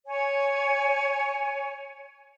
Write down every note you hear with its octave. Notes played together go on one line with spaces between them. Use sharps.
C#5 G#5